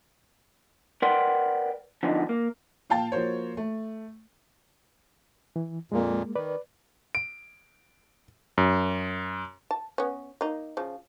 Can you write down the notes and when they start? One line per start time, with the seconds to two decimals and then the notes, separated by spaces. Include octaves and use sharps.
1.02 A#4 B4 D5 F#5 G5 C6
2.03 D3 F3 B3 D4 D#4
2.29 A#3
2.90 A#2 F5 G5 A5 A6
3.12 F3 A#3 F#4 C5 C#5
3.57 A3
5.56 E3
5.92 F2 A#2 G#3 A#3
6.36 D#3 B4 D5
7.15 D7
8.58 F#2
9.71 A5
9.98 B3 C#4
10.41 A#3 D#4
10.77 C#3 F3